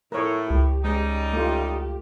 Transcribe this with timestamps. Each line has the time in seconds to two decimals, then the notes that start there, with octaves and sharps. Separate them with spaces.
0.12 A2 E4 A4 A#4 C#5
0.51 C#2 G4
0.84 G3 G#3 C#4 D#4
1.33 A3 F4 G4